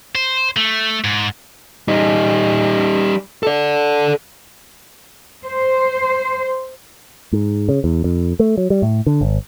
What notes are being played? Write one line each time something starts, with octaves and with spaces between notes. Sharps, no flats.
C5
A3
G#2
G3 D#4
A4 D5
C5
G#2
C#3
E2
F2
A3
F#3
G3
A2
D3
G#1